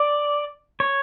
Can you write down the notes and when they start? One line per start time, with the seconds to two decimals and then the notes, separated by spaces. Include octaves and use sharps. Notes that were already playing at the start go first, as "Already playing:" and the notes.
Already playing: D5
0.80 C#5